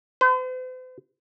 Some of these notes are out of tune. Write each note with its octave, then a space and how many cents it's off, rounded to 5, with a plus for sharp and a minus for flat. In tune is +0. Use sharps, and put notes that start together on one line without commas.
C5 -45